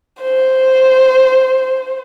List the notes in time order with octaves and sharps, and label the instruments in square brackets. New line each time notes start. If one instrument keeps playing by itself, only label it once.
[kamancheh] C5